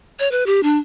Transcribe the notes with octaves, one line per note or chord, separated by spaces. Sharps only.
C#5
B4
G4
D4